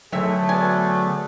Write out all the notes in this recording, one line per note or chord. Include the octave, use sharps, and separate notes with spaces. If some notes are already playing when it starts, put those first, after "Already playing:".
D3 D#3 F#3 A3 G#4 E5
B3 F#4 D5 G#5